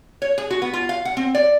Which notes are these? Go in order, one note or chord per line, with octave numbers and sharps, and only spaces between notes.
C#5
G#4
F#4
B3
F4
F5
F#5
C4
D5